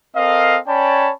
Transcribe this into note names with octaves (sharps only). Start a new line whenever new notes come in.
C4 A4 A#4 D#5 F5
C#4 C#5 D5 G5 A5 B5